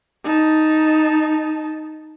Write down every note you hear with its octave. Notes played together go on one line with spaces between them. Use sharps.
D#4 A5